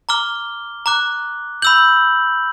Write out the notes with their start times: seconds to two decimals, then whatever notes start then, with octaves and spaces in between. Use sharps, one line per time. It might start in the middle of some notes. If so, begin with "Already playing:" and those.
0.09 A#5 D6 F6 G7
0.86 A#5 D6 F#6
1.62 B5 E6 G6 F#7